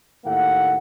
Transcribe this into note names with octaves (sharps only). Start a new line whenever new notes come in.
D#2 A2 A#3 E5 F#5